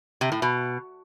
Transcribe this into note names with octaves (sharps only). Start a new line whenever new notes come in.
C3
A2
B2